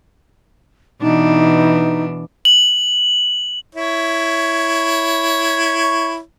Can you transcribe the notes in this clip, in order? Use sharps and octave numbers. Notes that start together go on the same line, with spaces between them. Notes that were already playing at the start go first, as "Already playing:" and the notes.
B2 E3 D4 D#4
F#7
E4 C#5